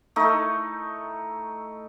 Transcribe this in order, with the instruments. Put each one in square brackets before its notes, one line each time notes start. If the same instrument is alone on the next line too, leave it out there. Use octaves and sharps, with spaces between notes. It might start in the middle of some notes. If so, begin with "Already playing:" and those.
[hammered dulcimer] A3 D#4 E4